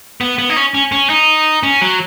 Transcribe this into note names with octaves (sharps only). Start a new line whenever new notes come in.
B3
B3
D#4
C#4
C#4
C#4
D#4
C#4
F#3